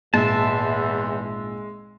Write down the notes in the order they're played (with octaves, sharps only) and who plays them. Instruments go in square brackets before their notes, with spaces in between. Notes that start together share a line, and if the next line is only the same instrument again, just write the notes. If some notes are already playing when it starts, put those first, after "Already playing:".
[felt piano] G#1 A#2 [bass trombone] E2 [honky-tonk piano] G#3 [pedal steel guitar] E5 A5